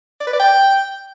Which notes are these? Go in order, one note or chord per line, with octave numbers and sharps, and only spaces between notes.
D5
B4
D5
G5